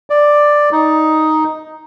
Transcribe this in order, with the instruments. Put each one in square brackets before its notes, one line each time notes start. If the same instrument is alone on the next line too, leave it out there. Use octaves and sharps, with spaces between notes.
[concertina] D5
D#4